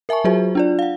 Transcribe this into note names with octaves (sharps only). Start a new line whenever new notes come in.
A#4 E5 G#5 A5 C#6
F#3 F4 F#4 G#4 C5 E5
D4 F4 D5
F5 F#5